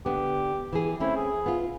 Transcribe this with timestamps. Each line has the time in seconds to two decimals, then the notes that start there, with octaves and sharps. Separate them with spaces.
0.06 D3 B3 D4 G4
0.73 E3 G#4
1.00 A3 C4 C#4 E4
1.16 G#4
1.46 B3 F4